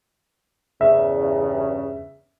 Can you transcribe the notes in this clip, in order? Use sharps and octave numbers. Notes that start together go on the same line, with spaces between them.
E2 G2 C#3 E5